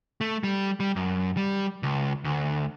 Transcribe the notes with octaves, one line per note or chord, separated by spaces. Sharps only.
A3
G3
G3
F#2
G3
C#2
D2